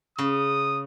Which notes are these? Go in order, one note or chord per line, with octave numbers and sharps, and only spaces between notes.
C#3 D#6